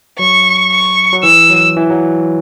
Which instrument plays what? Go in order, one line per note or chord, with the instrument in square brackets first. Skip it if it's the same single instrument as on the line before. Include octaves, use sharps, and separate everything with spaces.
[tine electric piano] F#3 [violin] C#6
[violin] C#6
[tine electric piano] F#3
[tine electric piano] E3 [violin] E6
[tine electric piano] F#3
E3
F#3